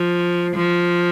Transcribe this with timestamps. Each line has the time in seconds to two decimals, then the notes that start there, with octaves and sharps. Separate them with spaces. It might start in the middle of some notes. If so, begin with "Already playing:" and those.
Already playing: F3
0.55 F3